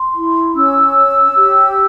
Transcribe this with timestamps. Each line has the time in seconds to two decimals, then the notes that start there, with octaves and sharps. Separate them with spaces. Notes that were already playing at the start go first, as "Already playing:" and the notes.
Already playing: C6
0.15 E4
0.55 C#4 E6
0.95 C#5
1.35 G4